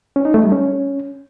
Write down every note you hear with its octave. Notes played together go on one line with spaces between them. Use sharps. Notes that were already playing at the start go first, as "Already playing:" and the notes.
C#4
D#4
A3
G3
C#4